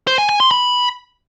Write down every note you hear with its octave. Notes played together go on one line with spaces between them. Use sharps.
C5
G#5
G#5
C6
B5